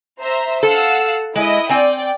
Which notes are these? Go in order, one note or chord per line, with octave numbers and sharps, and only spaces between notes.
C5 E5 A#5
A4 F5 F#5 E6
G#3 E4 D#5
C4 D5 G5 G#5